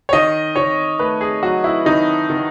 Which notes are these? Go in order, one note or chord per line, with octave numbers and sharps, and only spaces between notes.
C#5
D#3 D#5
D#3 C#5
A3 B4
G#4
F#3 F#4
E4
D#3 D#4
D#3